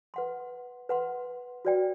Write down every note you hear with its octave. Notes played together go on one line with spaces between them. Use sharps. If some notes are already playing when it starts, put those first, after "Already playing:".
B4 F#5 C6
B4 F#5 C6
F#4 B4 D5 G5